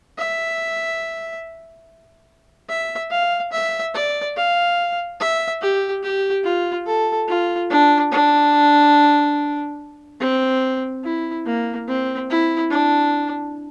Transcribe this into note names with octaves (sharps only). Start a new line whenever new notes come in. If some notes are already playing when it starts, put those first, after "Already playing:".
E5
E5
F5
E5
D5
F5
E5
G4
G4
F4
A4
F4
D4
D4
C4
E4
A#3
C4
E4
D4